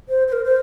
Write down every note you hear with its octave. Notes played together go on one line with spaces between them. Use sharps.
C5
C5
A#4
C5